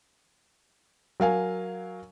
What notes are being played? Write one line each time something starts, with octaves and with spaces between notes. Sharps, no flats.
F#3 A#4 F5 G#5